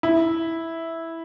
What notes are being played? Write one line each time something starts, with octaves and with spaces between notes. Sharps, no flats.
E4